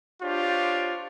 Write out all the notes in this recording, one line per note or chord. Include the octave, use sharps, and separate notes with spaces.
D4 F4 G4 C5 C#5